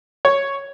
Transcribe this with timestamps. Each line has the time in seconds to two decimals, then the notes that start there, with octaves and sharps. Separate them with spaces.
0.25 C#5